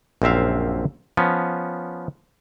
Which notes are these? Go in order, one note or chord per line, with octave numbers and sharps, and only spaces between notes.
A#1 F#2 C4 E5 F5
F3 B3 C#4